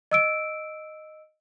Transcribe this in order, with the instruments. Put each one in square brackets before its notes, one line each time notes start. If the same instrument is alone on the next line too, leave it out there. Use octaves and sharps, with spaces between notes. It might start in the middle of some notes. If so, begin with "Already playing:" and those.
[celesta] D#5 E6 D7